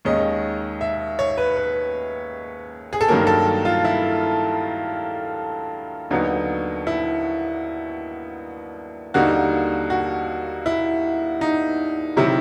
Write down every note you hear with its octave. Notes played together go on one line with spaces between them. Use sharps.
D#2 D#3 G#3 C#4 D#5
E5
C#5
B4
B4
G#4
A4
G2 D#3 F#3 A#3 A#4
A4
F4
E4
D#2 D3 F#3 B3 D#4
E4
D#2 D3 G3 A#3 D#4 F#4
F#4
E4
D#4
C3 D#3 F#3 E4